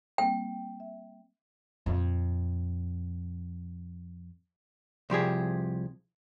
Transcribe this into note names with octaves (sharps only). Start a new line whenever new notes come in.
G3 A#3 C4 G5
E5
F2 A#2
C2 F3 G4 G#4